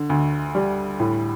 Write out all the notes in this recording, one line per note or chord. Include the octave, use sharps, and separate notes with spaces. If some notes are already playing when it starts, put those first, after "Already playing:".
Already playing: D3
D2
G3
A2